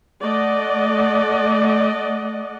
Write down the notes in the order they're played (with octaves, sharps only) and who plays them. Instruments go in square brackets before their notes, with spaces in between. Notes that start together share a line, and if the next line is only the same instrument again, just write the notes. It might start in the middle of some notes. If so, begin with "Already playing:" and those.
[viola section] A3 D5 D#5 F#5